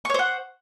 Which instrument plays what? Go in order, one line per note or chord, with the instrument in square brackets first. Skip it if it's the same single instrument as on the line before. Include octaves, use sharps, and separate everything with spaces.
[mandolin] C#6
C#5
C5
F#5